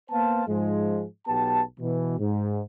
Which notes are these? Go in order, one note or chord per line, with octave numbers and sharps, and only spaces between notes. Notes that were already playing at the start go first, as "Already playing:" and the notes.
A#3 B3 C5 F5 A5
G#2 F3 G#3
B1 B3 G4 A5
B2 E3
G#2